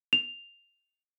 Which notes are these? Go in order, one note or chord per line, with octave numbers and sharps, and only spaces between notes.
F7